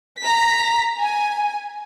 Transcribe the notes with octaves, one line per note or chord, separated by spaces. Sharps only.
A#5 B6
G#5